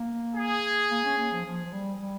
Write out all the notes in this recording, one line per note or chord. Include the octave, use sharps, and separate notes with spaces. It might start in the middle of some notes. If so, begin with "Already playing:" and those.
Already playing: A#3
G#4
A#3
C#4
A#3
F3
F3
F3
G3
G3